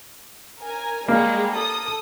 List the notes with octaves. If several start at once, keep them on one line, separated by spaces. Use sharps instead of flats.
A#4 G#5
G3 G#3 A#3
A4 D#6